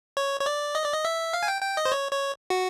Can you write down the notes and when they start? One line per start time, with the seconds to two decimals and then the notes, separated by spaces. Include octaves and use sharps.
0.17 C#5
0.41 C#5
0.46 D5
0.75 D#5
0.84 D5
0.94 D#5
1.05 E5
1.33 F5
1.43 G#5
1.48 G5
1.62 G5
1.77 D#5
1.85 C5
1.92 C#5
2.12 C#5
2.50 F#4